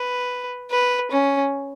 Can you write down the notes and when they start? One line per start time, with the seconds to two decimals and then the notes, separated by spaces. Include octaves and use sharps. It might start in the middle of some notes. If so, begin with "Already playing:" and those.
Already playing: B4
0.71 B4
1.11 C#4